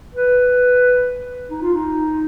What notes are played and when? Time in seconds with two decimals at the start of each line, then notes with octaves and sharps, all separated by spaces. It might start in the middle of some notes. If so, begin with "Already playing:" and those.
0.14 B4
1.51 D#4
1.62 F4
1.74 D#4